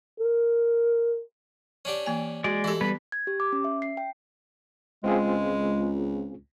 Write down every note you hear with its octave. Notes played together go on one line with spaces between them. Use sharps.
A#4
C#4 D4 G4
E3 A#3 G#5
G#3 F#4 D5
E3 E4 G4 A4
G3 B3 B4
G#6
G4
D6
C#4
E5
C7
G5
C#2 G#3 C4 F4 G#4